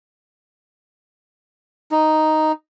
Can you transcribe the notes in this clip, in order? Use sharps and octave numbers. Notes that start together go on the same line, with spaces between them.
D#4